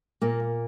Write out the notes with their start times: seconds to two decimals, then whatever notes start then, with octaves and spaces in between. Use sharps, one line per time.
0.22 A#2 A#3